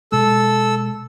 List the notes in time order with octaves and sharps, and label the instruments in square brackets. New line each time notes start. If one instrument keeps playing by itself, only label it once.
[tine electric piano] B2 G#3 [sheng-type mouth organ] A4 E6